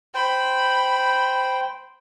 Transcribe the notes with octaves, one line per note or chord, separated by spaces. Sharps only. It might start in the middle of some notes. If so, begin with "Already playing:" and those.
C5 G5 B5